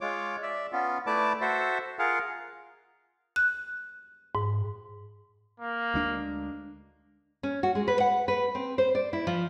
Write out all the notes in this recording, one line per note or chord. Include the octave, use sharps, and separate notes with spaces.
G#3 F4 C#5 D6
D5 E5
B3 C#4 F4
A3 E4 B4 D5 A5 D6
F#4 A4 C5 E5
F4 G#4 A#4 F5 F#5
F#6
G#2
A#3
D2 G#3 D4
C#4
F#4
G#3
B4
F#5
B4
C4
C5
D5
E4
F3